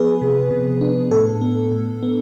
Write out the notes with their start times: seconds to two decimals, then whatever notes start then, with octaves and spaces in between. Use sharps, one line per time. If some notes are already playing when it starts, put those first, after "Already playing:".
Already playing: F3 B3 G#4 B4
0.22 C3
0.51 C3
0.81 D4
1.11 A2 A4
1.41 B3
1.72 A2
2.03 B3